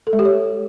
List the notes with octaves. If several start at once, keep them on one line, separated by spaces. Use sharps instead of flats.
A4
G#3
G4
C#5